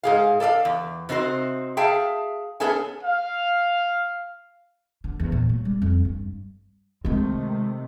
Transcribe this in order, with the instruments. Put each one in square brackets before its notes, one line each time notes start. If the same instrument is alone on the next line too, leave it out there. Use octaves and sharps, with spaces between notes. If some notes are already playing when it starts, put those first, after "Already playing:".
[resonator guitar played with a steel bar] G#2 G#4 F5
A4 D5 E5 F5
E2
C3 C4 D#4 F#4 C5
G#4 E5 F5 G5 A5
B3 C#4 G#4 A4 E5 G#5
[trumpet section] F5
[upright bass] D3
E2
A#2
F#3
G3
F2
G2
[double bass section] C3 D#3 A3 [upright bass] G#3 C4